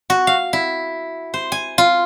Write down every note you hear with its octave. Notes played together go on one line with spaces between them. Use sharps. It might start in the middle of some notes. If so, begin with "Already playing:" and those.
F#4
F5
E4
C5
G#5
F4